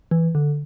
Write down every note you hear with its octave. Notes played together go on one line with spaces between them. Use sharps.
E3
D3